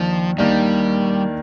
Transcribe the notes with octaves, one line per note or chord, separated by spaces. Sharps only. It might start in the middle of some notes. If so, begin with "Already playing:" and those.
Already playing: D#2 D#3 F3 A#3 D4
D#2 D#3 G3 A#3 D4